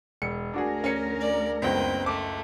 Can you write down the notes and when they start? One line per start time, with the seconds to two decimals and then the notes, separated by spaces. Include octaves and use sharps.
0.22 E1 C#7
0.54 D2 D4 F#4 G#4 A#4
0.84 C#4 C#7
1.20 D5
1.62 F#1 C#2 B3 C4 G5
2.06 A3 D6